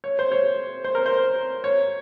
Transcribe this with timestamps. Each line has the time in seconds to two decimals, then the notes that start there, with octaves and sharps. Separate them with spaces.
0.04 C#5
0.19 C5
0.32 C#5
0.84 C5
0.95 A#4
1.06 C5
1.64 C#5